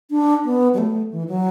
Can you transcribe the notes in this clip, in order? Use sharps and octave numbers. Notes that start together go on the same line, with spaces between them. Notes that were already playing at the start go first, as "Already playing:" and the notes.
D4
B3
F#3
A3
E3
F#3